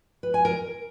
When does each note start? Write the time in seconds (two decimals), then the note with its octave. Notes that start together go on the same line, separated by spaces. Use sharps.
0.23 B4
0.34 G#5
0.45 A#4